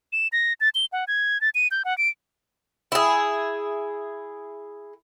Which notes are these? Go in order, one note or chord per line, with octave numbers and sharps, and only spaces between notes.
E7
A#6
A6
G7
F#5
G#6
A6
D#7
G6
F#5
D7
E4 G#4